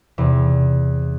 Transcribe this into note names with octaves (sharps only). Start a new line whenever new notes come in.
E2 C3